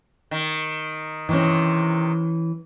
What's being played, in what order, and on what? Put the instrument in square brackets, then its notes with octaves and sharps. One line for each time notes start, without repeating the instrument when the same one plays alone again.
[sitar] D#3
[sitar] C3 D#3 [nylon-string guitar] E3 C#4